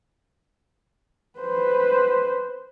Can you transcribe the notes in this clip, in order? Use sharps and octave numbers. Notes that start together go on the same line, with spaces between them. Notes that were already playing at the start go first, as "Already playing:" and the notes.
B4 C5